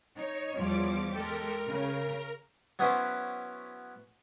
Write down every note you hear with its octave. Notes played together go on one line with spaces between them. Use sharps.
D#4 C#5
E2 F3 G3 D6
G#3 G4 A4 A#4
C#3
F#3 B3 C#4 E4 B4 C5